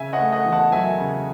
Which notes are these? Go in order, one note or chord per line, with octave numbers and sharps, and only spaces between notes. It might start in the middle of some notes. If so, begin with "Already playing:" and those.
Already playing: C#3 E5 G#5
D#5 F#5
A3
D#5 F#5
E2
F#5 A5
F#3 E5 G#5
C#3